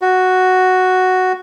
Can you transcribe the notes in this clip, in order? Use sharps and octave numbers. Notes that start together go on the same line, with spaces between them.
F#4